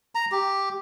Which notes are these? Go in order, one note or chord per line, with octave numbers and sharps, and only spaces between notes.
A#5
G4